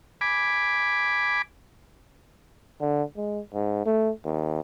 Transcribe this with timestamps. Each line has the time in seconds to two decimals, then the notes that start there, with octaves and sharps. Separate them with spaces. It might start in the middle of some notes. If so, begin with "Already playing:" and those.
0.21 G#5 B5 D6
2.80 D3
3.16 G#3
3.54 G#2
3.86 A3
4.25 D#2